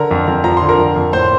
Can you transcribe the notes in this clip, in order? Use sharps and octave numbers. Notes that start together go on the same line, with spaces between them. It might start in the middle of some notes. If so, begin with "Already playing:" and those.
Already playing: D3 A#4 A#5
F2
F2
F3 A#5
D3 C6
A#4 A#5
F2
F2
A2 C5 C6